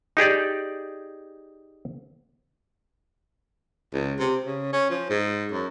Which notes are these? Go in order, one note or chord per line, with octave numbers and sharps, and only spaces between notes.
D#4 G4 G#4 D5
C#2
C3
C#3
C#4
F3
G#2
F#2